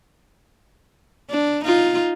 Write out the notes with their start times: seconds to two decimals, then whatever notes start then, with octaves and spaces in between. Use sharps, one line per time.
1.30 D4
1.65 D#4 F4